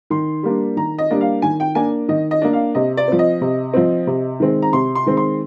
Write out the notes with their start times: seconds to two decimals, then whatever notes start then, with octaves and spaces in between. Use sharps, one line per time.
0.10 D#3 C6
0.43 G3 A#3 D4
0.76 D#3 A#5
0.98 D#5
1.10 G3 A#3 D4
1.21 F5
1.42 D#3 G#5
1.60 G5
1.75 A#3 D4 G#5
2.08 D#3 D#5
2.31 D#5
2.42 A#3 D4
2.53 F5
2.75 C3 D#5
2.97 D5
3.08 F3 C4
3.19 D#5
3.41 C3
3.74 F3 C4
4.07 C3
4.40 D#3 G#3 C4
4.62 A#5
4.73 C3 C6
4.95 C6
5.06 D#3 G#3 C4
5.17 C6